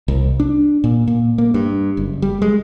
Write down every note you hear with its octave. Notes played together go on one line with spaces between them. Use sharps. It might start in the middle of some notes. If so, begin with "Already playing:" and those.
C2
D4
A#2
A#2
A#3
G2
F#1
G3
G#3